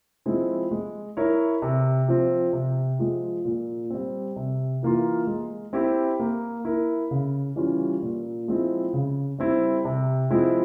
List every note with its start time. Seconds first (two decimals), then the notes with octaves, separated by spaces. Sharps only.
0.26 F3 G#3 C4 E4
0.71 G#3
1.17 E4 A#4 C#5
1.62 C3
2.08 F3 C4
2.53 C3
2.99 F3 G#3
3.45 A#2
3.90 G3 C4
4.36 C3
4.83 E3 A#3 F4
5.27 G#3
5.73 C4 E4 G4
6.20 A#3
6.65 E4 A#4
7.11 C#3
7.56 E3 G3 C#4 F4
8.03 A#2
8.48 F3 G#3 C4 E4
8.93 C#3
9.38 G3 C4 E4
9.85 C3
10.30 F3 G#3 C4 E4